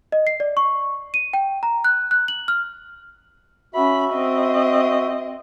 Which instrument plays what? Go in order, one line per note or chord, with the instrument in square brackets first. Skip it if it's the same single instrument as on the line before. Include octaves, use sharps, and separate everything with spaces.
[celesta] D#5
C7
D5
C#6
D#7
G5
A#5
F#6
F#6
F#7
F6
[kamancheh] C#4 B5 [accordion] F#4 E5
[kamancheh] C4 D#5